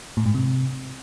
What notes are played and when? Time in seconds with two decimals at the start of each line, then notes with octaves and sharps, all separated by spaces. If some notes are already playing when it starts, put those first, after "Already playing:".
0.17 A2
0.26 G#2
0.34 C3